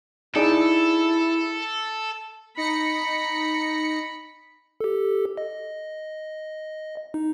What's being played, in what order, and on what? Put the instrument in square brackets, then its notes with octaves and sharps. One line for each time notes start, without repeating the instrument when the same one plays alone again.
[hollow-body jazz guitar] D#4 G#4 D5 [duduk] E4 [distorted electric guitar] A4
[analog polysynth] D#4 A#6 C#7 [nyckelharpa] B5
[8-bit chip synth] G4 A4
D#5
D#4